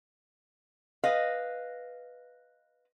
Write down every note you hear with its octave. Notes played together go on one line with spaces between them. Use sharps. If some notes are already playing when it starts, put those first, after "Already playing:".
B4 D#5 F5